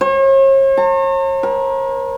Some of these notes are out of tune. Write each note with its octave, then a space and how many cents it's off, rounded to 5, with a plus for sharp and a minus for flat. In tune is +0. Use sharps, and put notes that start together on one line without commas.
C#5 -45
A#5 -45
A#4 +40